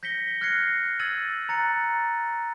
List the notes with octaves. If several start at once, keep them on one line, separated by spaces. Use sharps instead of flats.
G6 A#6 B6 C#7 G7
F6 F#6 G#6 A#6 C7 C#7
E6 G#6 A6 D#7 F#7
A#5 F#6 A6 C#7